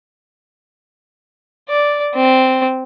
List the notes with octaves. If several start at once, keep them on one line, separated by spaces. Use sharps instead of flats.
D5
C4